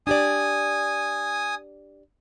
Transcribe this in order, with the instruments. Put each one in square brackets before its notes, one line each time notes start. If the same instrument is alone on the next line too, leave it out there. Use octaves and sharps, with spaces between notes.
[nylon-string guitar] D4 G4 D5 [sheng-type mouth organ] G#5 D#6